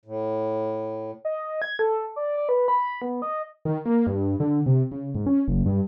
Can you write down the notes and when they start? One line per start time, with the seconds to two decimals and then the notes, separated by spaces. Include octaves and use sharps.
0.05 A2
1.25 D#5
1.62 G#6
1.79 A4
2.16 D5
2.37 D5
2.49 B4
2.68 B5
3.02 B3
3.22 D#5
3.65 D#3
3.85 A#3
4.07 G2
4.40 D3
4.66 C3
4.92 C#3
5.15 G#2
5.26 C#4
5.48 F#1
5.66 G2